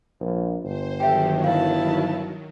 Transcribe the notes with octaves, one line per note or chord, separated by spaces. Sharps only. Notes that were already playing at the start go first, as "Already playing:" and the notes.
A#1
G1 C5
D#3 F#3 G4 A4 E5 G5
E4 F5 A5